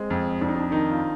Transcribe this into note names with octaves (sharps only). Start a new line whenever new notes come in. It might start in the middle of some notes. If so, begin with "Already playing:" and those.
Already playing: G#3 C4
F2
F2 D4
D#4
D4
D#3 D#4
F4